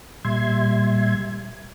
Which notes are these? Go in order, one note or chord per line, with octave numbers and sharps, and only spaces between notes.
A#2 G3 E5 C6 G#6